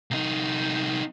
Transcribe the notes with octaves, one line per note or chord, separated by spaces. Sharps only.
C2 D#4